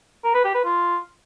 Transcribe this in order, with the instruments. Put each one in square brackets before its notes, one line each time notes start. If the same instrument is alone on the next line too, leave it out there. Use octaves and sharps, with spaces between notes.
[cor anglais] A#4
B4
G4
B4
F4